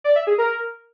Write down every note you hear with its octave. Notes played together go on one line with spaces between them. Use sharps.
D5
E5
G#4
A#4